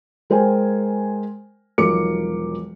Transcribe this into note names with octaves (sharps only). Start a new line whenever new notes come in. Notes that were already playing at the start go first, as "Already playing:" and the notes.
G#3 A#4 C5 G5 G#5
E1 B1 F3 A#4 D6 C#7